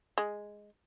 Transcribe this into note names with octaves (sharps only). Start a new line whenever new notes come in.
G#3